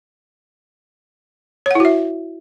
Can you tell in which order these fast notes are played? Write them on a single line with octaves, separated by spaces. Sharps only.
C#5 F#5 E4 F#4 E5